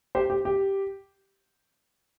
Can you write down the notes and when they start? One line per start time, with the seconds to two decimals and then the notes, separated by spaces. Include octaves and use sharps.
0.15 G4 C5
0.30 G4
0.45 G4